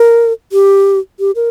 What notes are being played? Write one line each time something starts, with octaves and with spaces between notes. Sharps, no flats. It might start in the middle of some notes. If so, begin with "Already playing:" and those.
Already playing: A#4
G4
G4
A#4